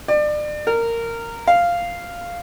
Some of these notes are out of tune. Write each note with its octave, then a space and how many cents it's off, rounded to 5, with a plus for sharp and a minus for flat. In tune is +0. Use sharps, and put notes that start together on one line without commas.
D5 +35
A#4 -15
F5 -5